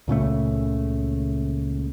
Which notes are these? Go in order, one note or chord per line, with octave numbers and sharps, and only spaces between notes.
C#2 A#2 C#3 A3